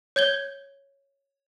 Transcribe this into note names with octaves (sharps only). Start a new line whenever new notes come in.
C#5 G6 G#6 G7